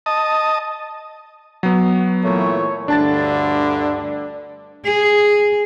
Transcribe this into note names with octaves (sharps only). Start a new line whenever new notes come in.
D#5 A5 D#6
F#3 B3
A#2 E3 A3 C#5
D2 G2 D3 D4 D5 A5 A6
G#4